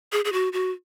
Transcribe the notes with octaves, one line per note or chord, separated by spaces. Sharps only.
G#4
G#4
F#4
F#4